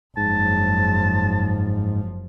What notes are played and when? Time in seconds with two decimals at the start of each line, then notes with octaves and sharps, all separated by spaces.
0.17 F#1 G#2 F3 A5